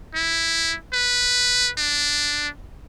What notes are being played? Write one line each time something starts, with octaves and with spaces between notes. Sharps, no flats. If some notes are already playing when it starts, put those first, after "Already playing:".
E4
B4
D4